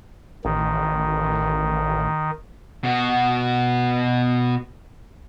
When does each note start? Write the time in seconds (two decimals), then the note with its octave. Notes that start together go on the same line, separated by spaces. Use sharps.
0.45 A1 D#3
2.83 B2 F#4